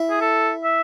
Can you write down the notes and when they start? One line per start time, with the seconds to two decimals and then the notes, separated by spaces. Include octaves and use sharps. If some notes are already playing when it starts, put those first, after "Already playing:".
Already playing: E4
0.10 G#4
0.21 A4
0.64 E5